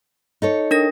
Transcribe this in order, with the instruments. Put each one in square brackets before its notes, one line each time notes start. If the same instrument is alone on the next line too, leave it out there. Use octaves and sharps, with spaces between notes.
[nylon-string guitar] D#4 A4 C#5
[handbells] D4 A#4 A#6